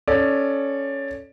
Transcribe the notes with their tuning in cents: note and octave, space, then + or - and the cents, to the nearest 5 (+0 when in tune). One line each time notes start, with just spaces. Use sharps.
C#4 +0 A4 -10 D5 +10